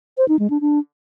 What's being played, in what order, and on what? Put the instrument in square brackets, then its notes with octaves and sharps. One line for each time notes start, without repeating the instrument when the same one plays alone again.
[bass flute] C5
D#4
G#3
D4
D4